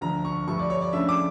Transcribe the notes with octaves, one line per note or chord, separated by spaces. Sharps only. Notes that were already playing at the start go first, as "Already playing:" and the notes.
D2 D3 F3 A#5
C#6
G2 F3 A3 C#6
D5
C#5
D5
C#3 F3 A3 D4 E5
D6